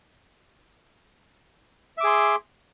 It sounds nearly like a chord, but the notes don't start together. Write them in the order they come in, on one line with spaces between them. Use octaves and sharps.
E5 D6 G#4 C6